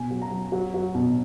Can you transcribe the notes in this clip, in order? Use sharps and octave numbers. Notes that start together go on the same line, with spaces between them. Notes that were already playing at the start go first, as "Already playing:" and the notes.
Already playing: B2 G#5
F#3
A#5
F#3
F#3
F#3
B2